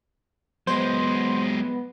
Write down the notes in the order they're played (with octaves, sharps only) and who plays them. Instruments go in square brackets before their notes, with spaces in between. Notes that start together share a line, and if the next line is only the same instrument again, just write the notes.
[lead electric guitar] F#3 G#3 [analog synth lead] B3 [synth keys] C5